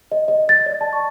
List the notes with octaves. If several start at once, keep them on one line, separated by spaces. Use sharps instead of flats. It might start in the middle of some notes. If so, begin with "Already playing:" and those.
D#5
D#5
A6
D5
A5
C#6